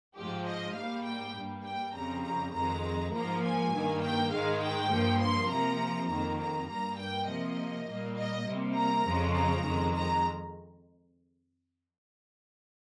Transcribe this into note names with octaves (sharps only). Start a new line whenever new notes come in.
G#2 F3 G#3 G4
D#5
G#2 G3 A#3 F5
G5
G2 G3 A#3
G5
F2 C#3 G3 A#5
A#5
F2 D#3 G#3 A#5
G#2 F3 A#3 A#5
G#5
G2 D#3 A#3
G5
G#2 D#3 G#3 F5
G5
G2 F3 A#3
C6
C3 F3 A#3 A#5
F2 D#3 A#3 A#5
A#5
G2 G3 A#3 A#5
G5
C3 F3 A#3 D#5
A#2 G3 A#3
D#5
C3 G3 A#3
A#5
F2 C#3 F3 G#3
A#5
F2 D#3 G#3
A#5